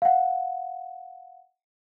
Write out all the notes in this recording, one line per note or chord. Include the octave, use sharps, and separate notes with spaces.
F5 F#5